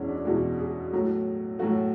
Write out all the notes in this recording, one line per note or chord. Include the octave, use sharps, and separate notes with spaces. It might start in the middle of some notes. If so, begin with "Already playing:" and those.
Already playing: E2 B2 G#3 C#4 E4
D4
E2 B2 G#3 E4
G#4
A2 F#3 A3
A2 F#3 A3 F#4